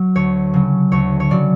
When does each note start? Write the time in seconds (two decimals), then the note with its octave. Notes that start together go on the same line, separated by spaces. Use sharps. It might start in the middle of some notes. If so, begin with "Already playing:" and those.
Already playing: F#3
0.15 D2 C#5
0.54 C#3 F#3
0.92 D2 C#5
1.20 C#5
1.31 C#3 F#3 D5